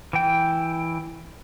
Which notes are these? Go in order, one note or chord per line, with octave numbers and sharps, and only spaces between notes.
E3 G5